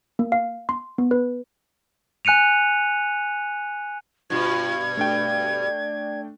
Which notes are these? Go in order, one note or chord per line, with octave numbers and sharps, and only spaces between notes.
A#3
F5
C6
B3
B4
G#5 F#6 C#7 D#7 F7
G2 B2 F4 G#6
A3 D4 D5 G5